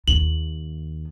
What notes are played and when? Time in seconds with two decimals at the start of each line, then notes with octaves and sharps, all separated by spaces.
0.08 D#2 F#7